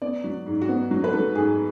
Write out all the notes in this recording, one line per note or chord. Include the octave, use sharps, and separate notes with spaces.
B3 D5
F#3
G#2
F#4
B3
F#3
B4
F#3 A4
G#2 G#4